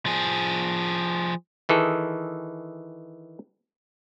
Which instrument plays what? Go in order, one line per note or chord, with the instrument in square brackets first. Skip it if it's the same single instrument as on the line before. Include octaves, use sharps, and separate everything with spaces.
[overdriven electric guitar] F3 G#4
[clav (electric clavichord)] D#3 E3 G#4 A4